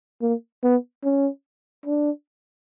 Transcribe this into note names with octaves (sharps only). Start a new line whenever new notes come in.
A#3
B3
C#4
D4